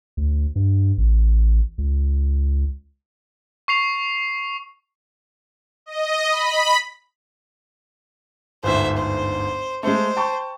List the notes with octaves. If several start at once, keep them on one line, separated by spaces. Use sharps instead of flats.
D2
G2
A1
C#2
C#6 C7 F7
D#5
B5
G1 D2 G#2 C5 E5
C5
G#3 A3 C5
G5 A5 C#6